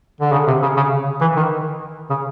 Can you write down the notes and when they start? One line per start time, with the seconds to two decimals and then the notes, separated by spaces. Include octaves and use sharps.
0.21 D3
0.32 C#3
0.48 C3
0.62 C#3
0.77 C#3
1.21 E3
1.37 D#3
2.10 C#3